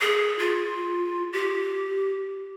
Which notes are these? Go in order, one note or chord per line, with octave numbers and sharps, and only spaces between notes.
G#4
F4
G4